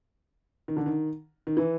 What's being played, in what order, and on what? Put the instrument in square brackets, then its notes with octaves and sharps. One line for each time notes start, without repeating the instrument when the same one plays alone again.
[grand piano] D#3
D3
D#3
D#3
E3